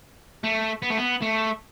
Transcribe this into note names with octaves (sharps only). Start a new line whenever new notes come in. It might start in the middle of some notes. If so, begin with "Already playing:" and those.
A3
B3
A3
B3
A3